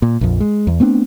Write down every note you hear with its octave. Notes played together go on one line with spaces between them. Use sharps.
A#2
A#1 F2
G#3
E2
A3 B3 C4 D4